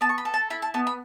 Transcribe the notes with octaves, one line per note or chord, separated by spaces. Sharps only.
B3 A5
C#6
B5
A4
A5
E4 B5
A5
B3 A5
B5